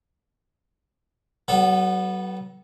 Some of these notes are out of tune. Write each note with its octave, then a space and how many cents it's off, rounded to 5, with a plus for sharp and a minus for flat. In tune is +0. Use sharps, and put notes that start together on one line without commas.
F#3 +35 B3 -15 A4 -20